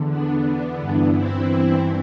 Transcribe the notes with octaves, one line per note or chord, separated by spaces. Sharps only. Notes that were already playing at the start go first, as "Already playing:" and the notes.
Already playing: E2 D3
B3 D4
G2 E3
C4 E4